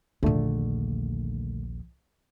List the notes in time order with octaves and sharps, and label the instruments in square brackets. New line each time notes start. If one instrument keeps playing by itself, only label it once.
[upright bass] A#1 D#2 [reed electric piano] A#2 D3 A3